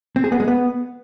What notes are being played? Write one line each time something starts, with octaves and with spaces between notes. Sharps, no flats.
C4
G#4
B3
G#3
B3